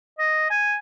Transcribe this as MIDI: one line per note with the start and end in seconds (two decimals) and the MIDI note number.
0.19 0.49 75
0.50 0.77 80